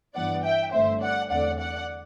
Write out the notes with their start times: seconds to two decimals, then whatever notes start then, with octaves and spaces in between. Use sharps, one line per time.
0.15 G2 E3 B3 D5 F#5
0.44 E5 G5
0.72 G1 G2 D3 A3 C4 C5 E5
1.01 D5 F#5
1.30 E2 D3 A3 C4 D5 F#5
1.59 D5 F#5